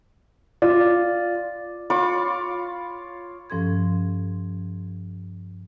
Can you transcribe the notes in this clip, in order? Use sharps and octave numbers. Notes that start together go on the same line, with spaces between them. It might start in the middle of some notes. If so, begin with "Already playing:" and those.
F4 D5
F4 C#5 B5 D6
G2 F3 C#4 A4 C6 G#6